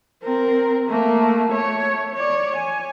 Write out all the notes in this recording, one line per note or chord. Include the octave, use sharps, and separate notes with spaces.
C4 A#4
A3 A#3
A3 C#5
C#5 D5
G#5